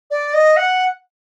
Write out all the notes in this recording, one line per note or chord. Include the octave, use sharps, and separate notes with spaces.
D5
D#5
F#5